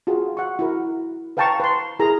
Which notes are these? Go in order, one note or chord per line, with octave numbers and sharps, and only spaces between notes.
F4 F#4 G#4
F#5 C#6
E4 F#4 A#4
B4 F5 G5 A5 A#5 C#6
B4 C6
E4 G#4 A#4 A#5